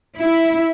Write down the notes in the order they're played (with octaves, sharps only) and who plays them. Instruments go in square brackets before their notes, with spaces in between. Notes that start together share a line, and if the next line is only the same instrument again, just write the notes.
[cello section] E4